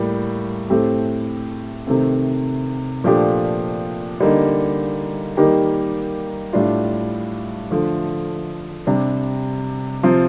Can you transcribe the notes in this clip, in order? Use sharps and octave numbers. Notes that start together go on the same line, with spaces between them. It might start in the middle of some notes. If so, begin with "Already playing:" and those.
Already playing: A2 G3 A#3
A2 A3 C4 G4
C3 D#3 A3 C4
A#2 F3 A3 D4 G4
D3 G3 A#3 D#4
D#3 G3 A#3 D#4 G4
A2 G3 D4 F4
D3 F3 A3
C3 G3 D4
C3 F3 C4 F4